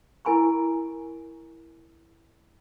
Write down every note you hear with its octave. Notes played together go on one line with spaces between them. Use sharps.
E4 A#4 G#5 B5 C#6